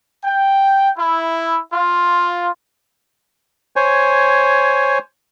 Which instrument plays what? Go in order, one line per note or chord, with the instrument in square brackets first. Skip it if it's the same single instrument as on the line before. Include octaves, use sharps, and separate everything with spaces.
[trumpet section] G5
E4
F4
[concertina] C5 C#5 G#5